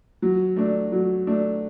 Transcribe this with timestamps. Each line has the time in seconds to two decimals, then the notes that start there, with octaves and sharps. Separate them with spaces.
0.22 F#3
0.56 A3 D4
0.92 F#3
1.27 A3 D4